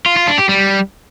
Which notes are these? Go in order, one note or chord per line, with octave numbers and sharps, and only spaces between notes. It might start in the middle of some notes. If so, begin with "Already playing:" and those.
F4
F4
D4
G4
G3